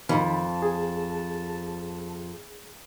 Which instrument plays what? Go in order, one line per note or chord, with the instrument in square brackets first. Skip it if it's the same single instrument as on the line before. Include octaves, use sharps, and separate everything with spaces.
[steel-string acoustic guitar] F2 [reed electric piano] D#3 B5 [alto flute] A5
[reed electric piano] G#4